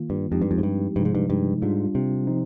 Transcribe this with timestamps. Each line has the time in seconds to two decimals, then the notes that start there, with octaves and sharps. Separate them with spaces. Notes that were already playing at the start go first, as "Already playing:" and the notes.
Already playing: D#3 A#3 F4
0.10 G2
0.31 F2 F3 G#3 C4 D#4 G4
0.42 G2
0.51 F2
0.58 G#2
0.63 G2
0.96 G2 C3 F3 G#3 D#4
1.05 G#2
1.15 G2
1.30 G2
1.62 G#2 G3 D4 F4
1.95 C3
2.27 F3 C4 D#4